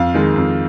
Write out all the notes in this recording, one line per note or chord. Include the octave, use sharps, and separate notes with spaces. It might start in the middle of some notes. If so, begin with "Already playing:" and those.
Already playing: F2 F5
D#3 G#3
F2